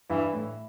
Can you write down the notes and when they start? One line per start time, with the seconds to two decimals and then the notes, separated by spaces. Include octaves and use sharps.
0.10 G2 E3
0.33 A2